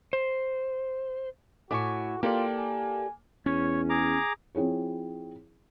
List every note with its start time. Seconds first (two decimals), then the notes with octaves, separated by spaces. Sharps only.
0.13 C5
1.71 A2 F#4 E5 G#5 C#6 D6
2.23 A#3 F4 G4 A4 D5
2.57 G#5
3.46 E2 C#4 C#5
3.90 G#4 A#5 D6
4.55 F3 C4 E4 G#4 C#5